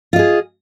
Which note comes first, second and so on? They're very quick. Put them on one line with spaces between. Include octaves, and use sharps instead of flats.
F4 D#5 G#4